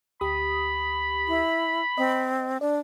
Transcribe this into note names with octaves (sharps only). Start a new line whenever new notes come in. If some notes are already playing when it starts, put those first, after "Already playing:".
D2 G4 B5 D#6
E4
C4 D#5
D4 D5